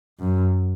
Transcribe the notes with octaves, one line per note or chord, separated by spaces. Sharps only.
F#2